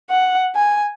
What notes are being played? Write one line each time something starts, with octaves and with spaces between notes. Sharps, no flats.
F#5
G#5